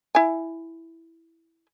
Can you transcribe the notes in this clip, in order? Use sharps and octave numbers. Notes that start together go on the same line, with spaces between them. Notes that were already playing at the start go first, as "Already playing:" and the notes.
E4 G#5